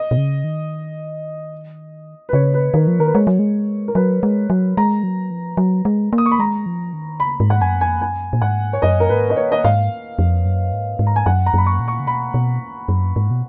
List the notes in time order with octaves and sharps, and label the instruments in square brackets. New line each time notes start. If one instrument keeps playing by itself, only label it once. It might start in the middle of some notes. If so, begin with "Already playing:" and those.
Already playing: [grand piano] D#5
[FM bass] B2
C#3
D#3
[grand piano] B4
[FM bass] C#3 [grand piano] C#5
[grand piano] B4
[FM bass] D#3 [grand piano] A#4
[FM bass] F3
[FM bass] D#3 [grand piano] A#4
[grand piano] B4
[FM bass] G#3 [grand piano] C#5
[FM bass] F#3
G#3
[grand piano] A#4
[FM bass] F#3 [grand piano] B4
[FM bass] G#3
F#3
[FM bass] G#3 [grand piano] A#5
[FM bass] F#3
F3
F#3
G#3
A#3
[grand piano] D#6
C#6
B5
[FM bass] G#3 [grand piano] A#5
[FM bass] F3
D#3
[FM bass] C#3 [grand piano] B5
[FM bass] G#2
[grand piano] F#5
[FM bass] F#2 [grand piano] G#5
[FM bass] F2 [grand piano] G#5
[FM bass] F#2 [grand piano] G#5
[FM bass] A#2
[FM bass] G#2 [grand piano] F#5
[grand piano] C#5
[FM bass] F#2 [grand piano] D#5
[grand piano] A#4
[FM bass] G#2 [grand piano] B4
[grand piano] D#5
C#5
D#5
[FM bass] G#2 [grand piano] F5
[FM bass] F2
F#2
G#2
G#2
[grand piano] A#5
G#5
[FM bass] F#2 [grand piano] F#5
[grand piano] A#5
[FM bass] F#2 [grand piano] B5
[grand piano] C#6
[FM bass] A#2
[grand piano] C#6
[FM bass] C#3
[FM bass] B2 [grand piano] B5
[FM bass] B2
F#2
G#2
B2